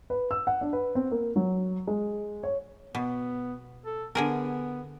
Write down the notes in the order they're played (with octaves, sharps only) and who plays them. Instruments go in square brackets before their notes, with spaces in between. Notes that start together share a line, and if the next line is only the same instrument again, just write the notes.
[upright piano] B4
E6
F#5
D4
B4
C4
A#3
F#3
G#3
C#5
[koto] B2 [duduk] B3
[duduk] A4
[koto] D3 G#4 A#4 [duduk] B3